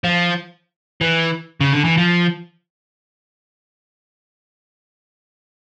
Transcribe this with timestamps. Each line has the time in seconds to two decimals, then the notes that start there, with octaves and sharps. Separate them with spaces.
0.04 F3
1.01 E3
1.61 C#3
1.73 D3
1.85 E3
1.97 F3